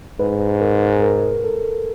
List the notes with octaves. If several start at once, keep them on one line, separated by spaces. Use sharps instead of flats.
G#2 B4
A#4
A#4
A4